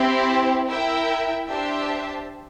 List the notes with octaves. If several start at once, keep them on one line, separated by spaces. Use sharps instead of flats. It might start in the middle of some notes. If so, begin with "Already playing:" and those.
Already playing: C4 E4 G4
E4 A#4 E5 G5
D4 G4 C5 E5 A5